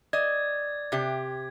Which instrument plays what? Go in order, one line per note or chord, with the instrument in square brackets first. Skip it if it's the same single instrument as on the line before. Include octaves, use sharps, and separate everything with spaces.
[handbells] D5 [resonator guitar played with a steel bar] D#5 [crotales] G#6
[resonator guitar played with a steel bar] C3 G4